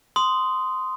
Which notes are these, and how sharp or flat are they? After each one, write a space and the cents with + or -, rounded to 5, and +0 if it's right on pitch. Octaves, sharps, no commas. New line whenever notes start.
C6 -10 D#6 +0